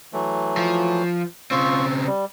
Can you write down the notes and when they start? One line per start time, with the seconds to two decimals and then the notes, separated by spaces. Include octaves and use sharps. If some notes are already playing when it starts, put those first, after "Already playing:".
0.13 E3 F#3 A3
0.57 F3
1.51 C#3 C4 F4 C#6
2.07 G3